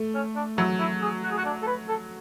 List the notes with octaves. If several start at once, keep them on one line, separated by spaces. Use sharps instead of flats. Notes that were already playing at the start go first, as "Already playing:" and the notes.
Already playing: A3
C#4
D4
F#3 E4
E4
G#4
F#4
G#4
F#4
D4
A4
B4
A4